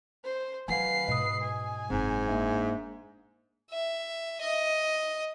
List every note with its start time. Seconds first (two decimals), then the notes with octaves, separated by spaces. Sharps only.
0.24 C5
0.68 D#3 F#3 B4 F5 F#5 G#5 C7
1.08 G#2 B2 D#5 D#6
1.42 G#5
1.90 F#1 G#2 C4
2.28 A#3 D4 E5
3.71 E5
4.41 D#5